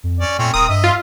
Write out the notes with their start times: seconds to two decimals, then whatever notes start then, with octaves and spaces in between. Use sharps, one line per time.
0.04 F2
0.20 C#4 D5
0.38 A#2 A3 C4 C#4
0.54 D#1 C4 A#4 D#6
0.69 G2 D#5 E5
0.84 F4